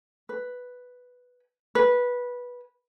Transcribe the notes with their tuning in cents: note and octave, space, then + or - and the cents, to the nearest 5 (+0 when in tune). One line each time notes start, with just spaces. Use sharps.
B4 +0
B4 -15